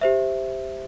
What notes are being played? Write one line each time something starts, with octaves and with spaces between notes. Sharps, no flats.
G4 C5 E5